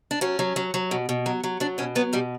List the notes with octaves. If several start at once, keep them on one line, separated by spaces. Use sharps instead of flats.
D4
F#3 C#4
F#3
F#3
F#3
B2
B2
F#3
F#3
F#3 D4
B2 C#4
F#3 B3
B2 G3